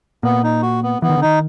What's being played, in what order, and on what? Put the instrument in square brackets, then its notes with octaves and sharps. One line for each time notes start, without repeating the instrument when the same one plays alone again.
[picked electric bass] A#2 [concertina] B3
[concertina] D#4
F#4
B3
[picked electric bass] E3 [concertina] B3
[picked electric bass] D#3
D3
[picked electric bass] D#3 [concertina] D#4